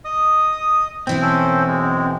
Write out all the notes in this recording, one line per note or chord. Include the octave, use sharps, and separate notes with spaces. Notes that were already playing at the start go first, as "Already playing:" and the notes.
D#5 D#6
B2 E3 C4 E4
C#4 A4 C5
F#2 G#3